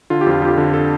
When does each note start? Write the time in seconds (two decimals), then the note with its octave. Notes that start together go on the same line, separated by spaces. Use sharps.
0.10 D3 F4
0.21 G4
0.27 F2 F4
0.42 F2 G4
0.58 D3
0.74 A4